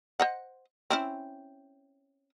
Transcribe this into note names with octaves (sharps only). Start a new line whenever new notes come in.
C5 D#5 F#5
C4 C#4 E4